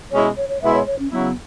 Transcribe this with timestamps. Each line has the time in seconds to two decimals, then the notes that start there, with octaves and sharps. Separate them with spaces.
0.11 B2 G#3 C#4 E4 C#5
0.37 C#5
0.49 C#5
0.61 B2 G#3 B3 E4 E5
0.73 C#5
0.86 C#5
0.99 C#4
1.11 C#3 F#3 B3 E4